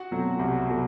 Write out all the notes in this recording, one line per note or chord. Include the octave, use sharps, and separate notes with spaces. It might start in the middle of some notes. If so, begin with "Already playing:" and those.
Already playing: F#4 F#5
B2 F#3 A3 C4
C2
B2 F#3 A3